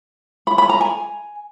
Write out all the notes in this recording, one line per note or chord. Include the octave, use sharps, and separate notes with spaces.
B5
B5
A#5
G#5